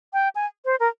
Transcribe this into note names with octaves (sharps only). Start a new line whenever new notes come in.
G5
G#5
C5
A#4